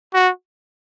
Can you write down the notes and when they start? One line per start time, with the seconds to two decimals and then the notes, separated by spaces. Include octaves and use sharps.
0.14 F#4